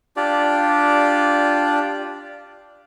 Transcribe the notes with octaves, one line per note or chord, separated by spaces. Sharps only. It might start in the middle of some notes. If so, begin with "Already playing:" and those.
D4 F4 G4 D5